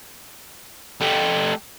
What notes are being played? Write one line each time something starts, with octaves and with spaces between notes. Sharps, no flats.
A3 G4